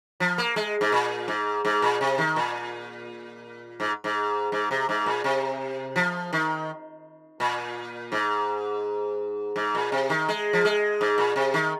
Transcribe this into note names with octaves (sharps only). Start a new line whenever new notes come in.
F3
A#3
G#3
G#2
A#2
G#2
G#2
A#2
C3
D#3
A#2
G#2
G#2
G#2
C3
G#2
A#2
C3
F3
D#3
A#2
G#2
G#2
A#2
C3
D#3
G#3
F3
G#3
G#2
A#2
C3
D#3